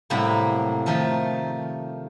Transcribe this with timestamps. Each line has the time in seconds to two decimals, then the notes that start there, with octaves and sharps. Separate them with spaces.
0.10 A2 C3 F#3 G3 A#3
0.86 D#3 F3 A3 A4 A#4